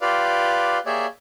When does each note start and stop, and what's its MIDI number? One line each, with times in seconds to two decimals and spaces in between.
0.01 0.78 65
0.01 0.78 67
0.01 0.78 71
0.01 0.78 74
0.01 0.78 77
0.86 1.06 58
0.86 1.06 67
0.86 1.06 68
0.86 1.06 73
0.86 1.06 74
0.86 1.06 76